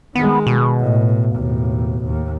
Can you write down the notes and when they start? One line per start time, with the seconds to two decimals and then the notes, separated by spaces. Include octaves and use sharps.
0.15 D#3 G#3 B3
0.47 B2
0.80 A2
1.36 D#2 A2
2.05 D#2